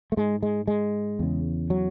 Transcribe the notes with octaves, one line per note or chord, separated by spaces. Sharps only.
A3
G#2 G#3
G#3
G#3
E2 C#3
F#3